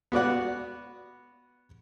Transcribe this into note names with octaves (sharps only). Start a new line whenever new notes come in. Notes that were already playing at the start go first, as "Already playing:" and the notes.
B3 F#4 D5 F#5